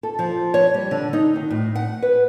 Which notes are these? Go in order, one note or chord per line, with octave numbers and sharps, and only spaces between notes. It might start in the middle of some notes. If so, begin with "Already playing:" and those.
A4
F3
C#5
G3
D3
D#4
D#3
A2
F#5
B4